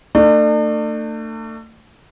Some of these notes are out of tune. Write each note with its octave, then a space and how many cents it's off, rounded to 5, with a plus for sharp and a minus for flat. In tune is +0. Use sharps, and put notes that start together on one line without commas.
A3 +35 D4 +40